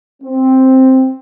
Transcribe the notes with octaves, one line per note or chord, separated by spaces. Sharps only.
C4